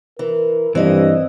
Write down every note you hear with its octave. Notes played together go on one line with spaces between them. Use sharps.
E3 A#4
G2 E3 C4 D4 D#5